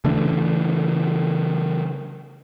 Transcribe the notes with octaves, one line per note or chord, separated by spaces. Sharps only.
C#3 E3 A3 D4